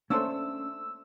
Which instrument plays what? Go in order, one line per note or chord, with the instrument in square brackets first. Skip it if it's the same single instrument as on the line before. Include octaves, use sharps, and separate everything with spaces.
[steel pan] A3 A4 C5 [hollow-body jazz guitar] A#3 C#4 D4 [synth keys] E6